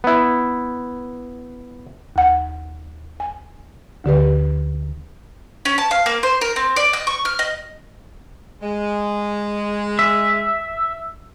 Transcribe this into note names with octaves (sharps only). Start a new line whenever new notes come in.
B3 E4
D#2 F#5
G#5
D2 D3 G4 B4
C#4
A5
F5
A#3
C5
A#4
C4
D5
D#5
C#6
F6
D#5
G#3
E5